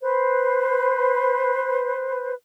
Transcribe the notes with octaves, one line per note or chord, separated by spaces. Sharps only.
B4 C5